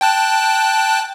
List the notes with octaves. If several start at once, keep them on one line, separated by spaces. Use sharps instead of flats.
G5 A5 F#6